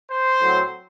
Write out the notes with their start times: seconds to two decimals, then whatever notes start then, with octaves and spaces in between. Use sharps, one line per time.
0.10 C5
0.40 A2 F#3 C4